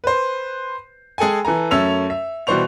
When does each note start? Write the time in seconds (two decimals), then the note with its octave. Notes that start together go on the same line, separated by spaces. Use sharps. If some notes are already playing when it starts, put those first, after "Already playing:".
0.04 B4 C5
1.18 G#3 G#4 A4 G5 G#5
1.45 E3 A4 G#5 A#5
1.71 F#2 A3 C#4 E5 E6 F7
2.10 E5
2.47 B2 E3 G3 C5 C#6 F7